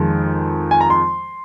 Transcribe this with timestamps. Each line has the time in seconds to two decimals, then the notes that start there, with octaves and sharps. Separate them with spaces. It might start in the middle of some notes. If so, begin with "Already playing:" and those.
Already playing: F2 D#3 G#3
0.71 G#5
0.81 A#5
0.90 C6